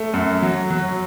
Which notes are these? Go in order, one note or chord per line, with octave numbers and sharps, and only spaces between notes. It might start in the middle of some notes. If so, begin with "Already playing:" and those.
Already playing: A3
F#2
F#3
F#3